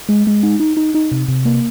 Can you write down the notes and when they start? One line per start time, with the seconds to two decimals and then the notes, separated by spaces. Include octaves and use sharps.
0.09 G#3
0.27 G#3
0.43 D#4
0.60 D#4
0.77 D#4
0.95 D#4
1.12 C3
1.28 C3
1.45 A#3